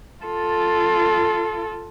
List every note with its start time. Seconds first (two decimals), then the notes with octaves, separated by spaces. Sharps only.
0.24 F4 A4